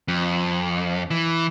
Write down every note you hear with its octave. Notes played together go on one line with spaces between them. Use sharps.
F2
E3